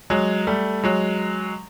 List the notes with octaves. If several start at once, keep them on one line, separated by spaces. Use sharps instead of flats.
F#3 G#3
G3 A3
F#3 G#3